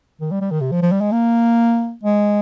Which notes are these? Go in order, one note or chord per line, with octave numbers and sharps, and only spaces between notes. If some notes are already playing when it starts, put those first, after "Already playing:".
D#3
G3
G3
D#3
C3
F3
F3
G3
G#3
A#3
G#3